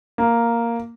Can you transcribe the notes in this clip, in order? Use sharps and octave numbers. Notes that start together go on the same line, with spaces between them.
A#3